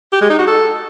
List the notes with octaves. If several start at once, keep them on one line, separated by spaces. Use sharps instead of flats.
G4
G#3
D#4
F#4
A4